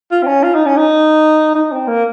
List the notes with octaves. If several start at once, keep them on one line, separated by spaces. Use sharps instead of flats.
F4
C4
C#4
F4
D#4
C#4
D#4
D#4
C4
A#3